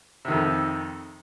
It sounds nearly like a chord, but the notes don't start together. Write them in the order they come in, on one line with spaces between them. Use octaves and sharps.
C3 D#3 F2